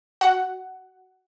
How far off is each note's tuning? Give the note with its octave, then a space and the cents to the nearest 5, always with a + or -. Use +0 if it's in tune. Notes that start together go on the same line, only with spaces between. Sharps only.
F#4 +5 F#5 +10